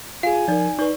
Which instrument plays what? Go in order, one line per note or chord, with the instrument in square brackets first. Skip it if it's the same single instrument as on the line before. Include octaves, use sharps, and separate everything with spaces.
[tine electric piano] F4 G#4 [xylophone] F5 [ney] G#5
[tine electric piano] F3 A#4 [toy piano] D#4 D5
[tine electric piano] D#4 B4 [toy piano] D5 C#6